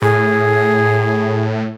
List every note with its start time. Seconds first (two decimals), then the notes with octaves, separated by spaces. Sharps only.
0.02 A2 G#4